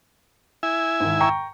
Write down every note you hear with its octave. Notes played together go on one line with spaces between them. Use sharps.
E4 E5 G#5
G#2 D#3
G5 A#5 C#6